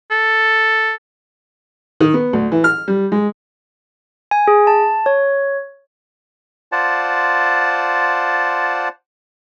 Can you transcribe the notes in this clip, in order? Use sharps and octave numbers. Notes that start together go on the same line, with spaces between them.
A4
D#3
B3
D2
E3
F6
G3
G#3
G#5
G#4
A5
C#5
F4 C5 D5 F#5 A5